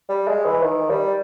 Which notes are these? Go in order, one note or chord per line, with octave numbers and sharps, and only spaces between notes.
G3
G#3
E3
D#3
G3